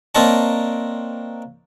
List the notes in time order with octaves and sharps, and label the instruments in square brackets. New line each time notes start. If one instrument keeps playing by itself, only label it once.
[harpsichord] A#3 C4 D4 D#4 C#5 A5